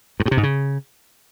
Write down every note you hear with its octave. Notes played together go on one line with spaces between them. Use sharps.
G2
A2
C3
G#2
C#3